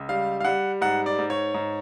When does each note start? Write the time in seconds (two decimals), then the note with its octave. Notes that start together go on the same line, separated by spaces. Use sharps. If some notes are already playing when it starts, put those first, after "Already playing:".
Already playing: C#2
0.09 G3 F5
0.40 F5
0.45 G3 F#5
0.81 G#2 F#5
1.06 D5
1.18 G#2
1.30 C#5
1.54 G#2